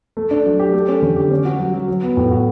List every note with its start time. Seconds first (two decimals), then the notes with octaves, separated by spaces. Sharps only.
0.17 A3
0.31 D4
0.46 F#3
0.60 G4
0.74 A3
0.88 C#4
1.02 D3
1.16 G4
1.31 C#4
1.45 F#4
1.59 F#3
1.73 F#3
1.88 F#3
2.03 B3
2.17 A2
2.31 F#4